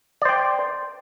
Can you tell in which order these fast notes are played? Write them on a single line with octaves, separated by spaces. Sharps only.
D5 C5 G5